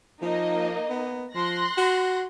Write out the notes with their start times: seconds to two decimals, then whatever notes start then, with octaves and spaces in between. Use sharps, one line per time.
0.22 F3 A#3 D#4 D#5
0.89 B3
1.35 F3 C6 F#6 A#6
1.77 F#4